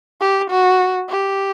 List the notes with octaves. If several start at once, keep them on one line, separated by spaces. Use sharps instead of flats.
G4
F#4
G4